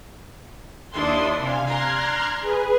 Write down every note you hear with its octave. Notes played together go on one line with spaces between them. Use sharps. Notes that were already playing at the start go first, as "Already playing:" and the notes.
D#2 D4 E4 C6 D#6
C3 F5 G#5
D4 A#5 C6 F6 F#6 G#6
G#4 B4